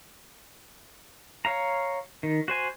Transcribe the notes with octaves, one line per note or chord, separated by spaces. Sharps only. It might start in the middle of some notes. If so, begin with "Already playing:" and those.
C#5 F5 A#5
D#3
F#4 C5 G#5